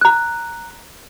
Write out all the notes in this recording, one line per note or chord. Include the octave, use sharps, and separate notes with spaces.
A#5 F#6